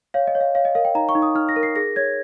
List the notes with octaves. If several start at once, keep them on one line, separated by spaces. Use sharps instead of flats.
C#5 F5
D#5
C#5
F5
C#5 F5
D#5
A#4 F5
G5
D#4 A#5
C#6
D#4
D#6
D#4 F6
A#6
A#4
C7
G#4 A#6
C#5 G#6